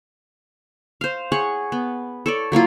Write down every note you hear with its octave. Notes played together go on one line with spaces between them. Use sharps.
C5 F5
G#4 C#5 F#5
B3
A4 C#5 D5
F#3 A#3 E4 F4